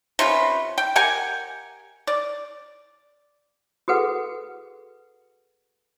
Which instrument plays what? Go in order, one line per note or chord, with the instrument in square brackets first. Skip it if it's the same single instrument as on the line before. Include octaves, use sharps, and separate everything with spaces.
[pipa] C3 C#4 F4 B4
G5
G4 A#4 F#5 G#5
D5
[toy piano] F#4 G#4 A4 B4 F#5